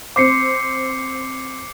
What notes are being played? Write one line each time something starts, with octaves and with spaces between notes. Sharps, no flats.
C4 C5 D6 C7 C#7